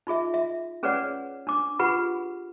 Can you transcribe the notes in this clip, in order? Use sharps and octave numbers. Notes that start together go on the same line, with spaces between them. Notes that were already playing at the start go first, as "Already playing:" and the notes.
D#4 F4 G#4 E5
E5
C#4 G#4 B4 C#5 D5 F#5
D4 D6
F4 G4 G#4 B4 F#5 B5